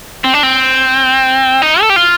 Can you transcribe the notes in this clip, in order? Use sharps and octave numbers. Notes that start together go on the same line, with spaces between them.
C4
D4
C4
D#4
A4
G4
F4